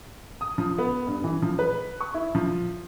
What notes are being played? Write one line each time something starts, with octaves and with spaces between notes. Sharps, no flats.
D#6
F3
B3
G2
E3
F3
B4
C#6
E4
F3